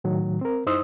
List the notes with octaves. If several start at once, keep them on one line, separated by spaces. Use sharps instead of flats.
A2 D#3 F#3
C4 A#4
F#2 D#4 E4 C5 D#6 E6